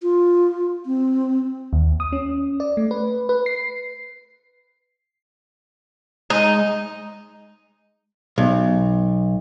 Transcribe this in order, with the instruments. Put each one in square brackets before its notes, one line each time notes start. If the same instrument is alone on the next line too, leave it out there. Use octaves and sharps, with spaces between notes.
[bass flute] F4
C4
[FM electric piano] D#2
D#6
C#4
D5
A3
B4
B4
C7
[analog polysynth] G#3 [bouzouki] D#4
[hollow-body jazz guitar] B1